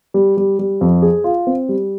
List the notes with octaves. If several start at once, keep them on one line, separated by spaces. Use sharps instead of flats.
G3
G3
G3
F2
G#4
F4
C4
G3